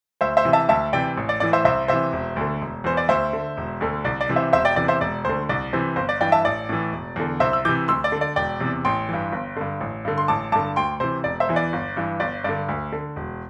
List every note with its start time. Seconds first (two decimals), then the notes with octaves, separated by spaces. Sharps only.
0.21 D2 C5 E5
0.37 C5 E5
0.45 C3 E3
0.53 E5 A5
0.69 D2 E5 A5
0.93 C3 E3 D5 G5
1.17 A1
1.29 D5
1.40 A2 E3 D5
1.53 C5 E5
1.65 C2 C5 E5
1.88 C3 E3 C5 E5
2.13 E1
2.36 D2 D3
2.61 E1
2.84 E2 E3 C5
2.97 D5
3.08 D2 C5 E5
3.33 D3
3.57 E1
3.81 D2 D3
4.04 C2 D5
4.21 D5
4.29 C3 E3
4.36 C5 E5
4.53 E1 C5 E5
4.65 D5 G5
4.76 E2 C3 E3 D5
4.88 C5 E5
5.01 E1 D5
5.25 D2 D3 C5
5.49 C2 D5
5.73 C3 E3 C5
5.96 G1 C5
6.09 D5
6.20 G2 E3 D5 G5
6.32 E5 A5
6.45 A1 D5
6.69 A2 E3
6.92 E1
7.16 E2 D3
7.40 C2 C5 E5
7.53 E6
7.65 C3 E3 D6 G6
7.88 D2 C6 E6
8.04 D5
8.12 D3
8.21 D5
8.36 E1 D5 G5
8.60 E2 C3
8.85 A1 G5 C6
9.09 G2 E3
9.32 G1
9.56 G2 D3
9.80 A1
10.05 G2 D3
10.18 C6
10.28 A1 A5 D6
10.52 G2 D3 A5 D6
10.76 D2 G5 C6
11.00 C3 E3 C5
11.24 E1 D5
11.40 C5 E5
11.49 E2 E3
11.56 D5
11.73 G1
11.97 G2 E3
12.20 G1 D5
12.44 G2 D3 D5
12.68 D2
12.92 D3
13.16 E1